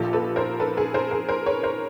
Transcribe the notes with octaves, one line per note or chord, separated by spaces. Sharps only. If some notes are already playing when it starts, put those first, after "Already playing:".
Already playing: A#1 A#2 F3 G4 A4
A4 B4
A#4 C5
A4 B4
G#4 A#4
A#4 C5
G#4 A#4
A#4 C5
B4 C#5
A#4 C5